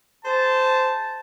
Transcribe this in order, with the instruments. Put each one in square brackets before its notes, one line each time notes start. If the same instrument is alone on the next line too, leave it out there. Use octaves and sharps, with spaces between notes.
[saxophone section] G#4 C5 [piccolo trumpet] A5